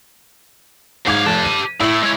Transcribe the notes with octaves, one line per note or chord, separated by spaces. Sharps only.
G#2 F#3 F5 D6 G#6
F1 G4 A5
D#7
A2 E4 E6 F#7
G#3 C#5